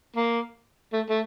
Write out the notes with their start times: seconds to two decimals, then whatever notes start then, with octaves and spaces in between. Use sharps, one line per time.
0.16 A#3
0.93 A3
1.10 A3